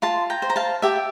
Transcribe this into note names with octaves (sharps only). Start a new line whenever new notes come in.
F4 A5 C6
G5 A#5
C5
A#5
F5 A5
G4 E5 G5